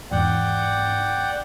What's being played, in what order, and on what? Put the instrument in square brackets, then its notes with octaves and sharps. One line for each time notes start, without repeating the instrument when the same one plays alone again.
[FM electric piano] E2 G#2 [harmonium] D5 F#5 G5